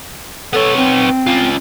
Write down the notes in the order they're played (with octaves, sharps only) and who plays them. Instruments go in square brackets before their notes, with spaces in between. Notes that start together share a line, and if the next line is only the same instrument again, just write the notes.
[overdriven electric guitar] B3 C#5 [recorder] A4
[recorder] C4
[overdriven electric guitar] C#3 F4